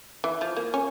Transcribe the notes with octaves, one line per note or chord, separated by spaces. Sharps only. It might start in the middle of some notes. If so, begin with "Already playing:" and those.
E3
F3
A#3
C#4